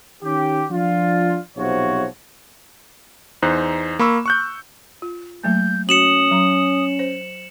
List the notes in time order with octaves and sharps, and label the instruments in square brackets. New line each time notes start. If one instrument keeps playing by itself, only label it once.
[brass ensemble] D#3 C#4 G4
F3 D4 F4
B1 C3 F3 F#4 C#5
[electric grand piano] E2 D#4 C5 F#6
A#3 B5 C#6 E6
C#6 F#6 G6
[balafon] F4
[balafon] F#3 A3 A#3 [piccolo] G6
[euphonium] C#4 [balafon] F#4 [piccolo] D#6 [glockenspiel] C#7 E7 F#7
[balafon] F#3 A#5
C5